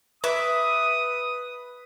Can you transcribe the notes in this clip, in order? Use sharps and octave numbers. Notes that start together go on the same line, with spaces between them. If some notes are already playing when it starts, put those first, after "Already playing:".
B4 E5 D6 D#6